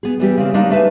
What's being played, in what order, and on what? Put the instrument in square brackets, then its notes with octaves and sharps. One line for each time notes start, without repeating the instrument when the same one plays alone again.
[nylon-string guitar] B3 G#4
E3 G3 G4
C#3 A#3 C4 D4
G3 G#3 A#3 D4 D#4
A3 B4 E5 G#5 A5